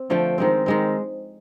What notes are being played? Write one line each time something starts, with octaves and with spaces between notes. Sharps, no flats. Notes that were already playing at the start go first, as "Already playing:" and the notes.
Already playing: C4
D3 F3 A3 G5
D#3 G#3 C4
D#3 G#3 C4